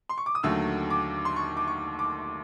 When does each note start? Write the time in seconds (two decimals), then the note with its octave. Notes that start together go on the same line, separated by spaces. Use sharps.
0.09 C6
0.18 C#6
0.26 D6
0.35 D#6
0.43 D#2 D3 F#3 A3 E6
0.90 D6
1.25 C6
1.36 C#6
1.57 D6
1.68 C#6
1.99 D6